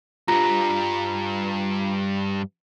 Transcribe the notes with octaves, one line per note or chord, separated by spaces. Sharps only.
C2 G2 F4 A#5